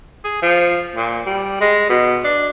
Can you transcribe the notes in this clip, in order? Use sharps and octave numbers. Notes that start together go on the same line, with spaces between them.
G#4
F3
A#2
G3
G#3
B2
D4